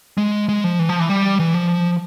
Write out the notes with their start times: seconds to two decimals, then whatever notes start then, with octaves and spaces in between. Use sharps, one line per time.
0.18 G#3
0.49 G#3
0.64 F3
0.79 E3
0.89 F3
1.00 E3
1.09 G3
1.40 E3
1.54 F3